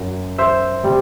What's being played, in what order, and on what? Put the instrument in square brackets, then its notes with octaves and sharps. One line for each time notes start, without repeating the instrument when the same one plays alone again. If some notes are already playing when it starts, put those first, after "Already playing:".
Already playing: [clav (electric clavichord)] F#2
C5 E5
C3 G3